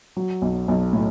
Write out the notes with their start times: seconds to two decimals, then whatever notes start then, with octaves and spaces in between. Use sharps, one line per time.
0.17 F#3
0.42 B1
0.68 B1
0.93 A2